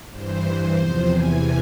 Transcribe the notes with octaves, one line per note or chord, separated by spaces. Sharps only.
G2 E3 C5
G2 E3 C5
E2 C3 F3
E2 C3 E3 G#5